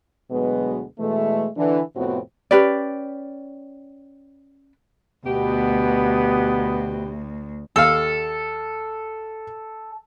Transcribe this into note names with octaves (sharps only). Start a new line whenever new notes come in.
D2 B2 F#3 G#3 B3
B2 E3 G#3 A3
D3 E3
F2 A2 C3 B3 C4 F#4
C#4 G4 B4 D5
D2 B2 B3 G4 B4
D#2 A4 F5